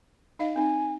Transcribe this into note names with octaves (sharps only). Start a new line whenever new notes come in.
D#4 D#5 F5
C4 D#4 G#5